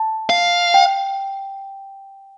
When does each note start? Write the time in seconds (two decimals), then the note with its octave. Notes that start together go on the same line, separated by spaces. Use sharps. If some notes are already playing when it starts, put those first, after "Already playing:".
Already playing: A5
0.30 F5
0.74 G5